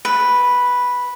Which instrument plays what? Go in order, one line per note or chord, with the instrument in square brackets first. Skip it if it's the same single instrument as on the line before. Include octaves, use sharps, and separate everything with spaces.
[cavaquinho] B4